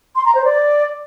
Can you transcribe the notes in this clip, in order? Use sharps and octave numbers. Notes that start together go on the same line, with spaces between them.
C6
A#5
C5
D5